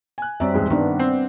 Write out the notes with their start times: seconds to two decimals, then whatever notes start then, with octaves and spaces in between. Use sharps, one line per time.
0.18 G#5 F#6
0.40 F#2 G3 C4 D5 E5
0.54 E1 G#2 G#3
0.70 G2 D#3 B3 D4
1.00 C4